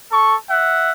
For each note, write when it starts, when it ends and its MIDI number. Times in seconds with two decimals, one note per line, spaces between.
0.10 0.33 69
0.10 0.33 85
0.48 0.91 76
0.48 0.91 78